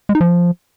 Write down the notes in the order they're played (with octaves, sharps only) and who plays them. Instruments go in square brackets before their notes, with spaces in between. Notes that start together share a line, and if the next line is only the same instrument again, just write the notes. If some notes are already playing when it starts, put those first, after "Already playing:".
[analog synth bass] G#3
D#4
F3